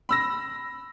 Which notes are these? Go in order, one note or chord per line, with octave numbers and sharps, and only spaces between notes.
B5 E6 A#6